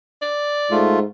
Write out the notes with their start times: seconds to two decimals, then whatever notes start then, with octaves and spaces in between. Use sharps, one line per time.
0.22 D5
0.71 G#2 A3 F4